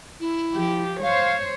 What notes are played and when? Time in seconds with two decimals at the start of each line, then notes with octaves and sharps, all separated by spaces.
0.20 E4
0.53 F3 G4
1.03 C5 C#5 F5